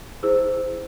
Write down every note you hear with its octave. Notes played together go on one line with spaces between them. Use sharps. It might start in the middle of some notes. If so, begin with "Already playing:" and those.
E4 G#4 C5 E6